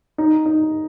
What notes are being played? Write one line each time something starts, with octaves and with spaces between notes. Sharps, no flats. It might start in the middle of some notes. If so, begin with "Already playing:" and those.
D#4
D#4